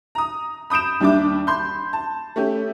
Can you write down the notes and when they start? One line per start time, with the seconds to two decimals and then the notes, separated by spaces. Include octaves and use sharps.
0.15 A#5 D#6
0.70 B5 D#6 G6 D7 E7
1.00 D#2 G3 D4 E5 D6
1.47 B5 C6 G6
1.93 A5
2.36 A3 C#4 G4 E5